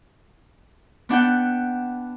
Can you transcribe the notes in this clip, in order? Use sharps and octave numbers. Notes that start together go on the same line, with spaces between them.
B3 D4 F#5 G5